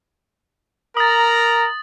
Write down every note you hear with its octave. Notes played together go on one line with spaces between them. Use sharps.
A#4 A#5 D#6 A6